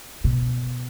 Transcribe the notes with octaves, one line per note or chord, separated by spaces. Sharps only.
B2